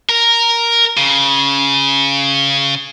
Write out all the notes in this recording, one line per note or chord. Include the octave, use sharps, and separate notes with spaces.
A#4
C#3